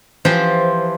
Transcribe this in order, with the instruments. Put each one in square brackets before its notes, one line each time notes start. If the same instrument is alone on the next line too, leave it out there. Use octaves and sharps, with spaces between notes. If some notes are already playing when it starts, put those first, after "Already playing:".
[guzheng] E3 F3 F4 G4 C5